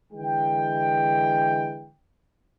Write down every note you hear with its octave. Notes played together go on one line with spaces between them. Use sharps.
D3 E3 G#3 G5